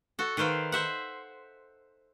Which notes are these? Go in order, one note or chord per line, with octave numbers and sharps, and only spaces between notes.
F#4 A4
D#3 B4 C5 F5 G5
C5 E5 F#5